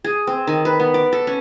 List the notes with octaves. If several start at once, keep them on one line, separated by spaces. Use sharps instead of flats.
G#4
C4
D#3
B4
B3
D5
A4
C#4